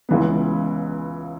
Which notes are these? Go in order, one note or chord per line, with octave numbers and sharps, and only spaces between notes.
C#2 C#3 E3 B3